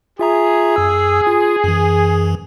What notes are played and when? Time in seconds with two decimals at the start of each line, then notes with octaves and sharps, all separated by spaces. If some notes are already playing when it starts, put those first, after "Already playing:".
0.19 F4 G#4 E5 A#5
0.76 F#2 E6
1.27 F4
1.64 F#2 E3